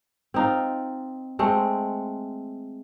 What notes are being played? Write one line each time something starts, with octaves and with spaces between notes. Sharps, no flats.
C4 D#4 F4
G#3 A3 C4